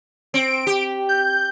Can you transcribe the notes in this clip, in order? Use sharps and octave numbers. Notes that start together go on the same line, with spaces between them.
C4 D7
G4
G6